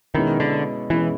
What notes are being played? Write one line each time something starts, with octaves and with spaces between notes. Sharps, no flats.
B2 D#3 G#3 C#4 E4
D3
B2 E3 G#3 C#4 E4